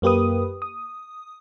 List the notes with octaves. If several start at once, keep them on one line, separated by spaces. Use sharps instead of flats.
F#2 A#3 G4 B4 D#6
D#6